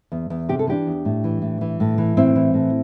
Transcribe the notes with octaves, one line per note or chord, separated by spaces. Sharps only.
E2
E2
C3 G4
A4
E3 D4 G4
E2
A2
E3
A2
E3
A2
E3
A2 C4 E4
E3
A2